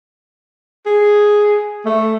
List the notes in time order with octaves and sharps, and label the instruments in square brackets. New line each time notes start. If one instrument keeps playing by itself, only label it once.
[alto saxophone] G#4
A3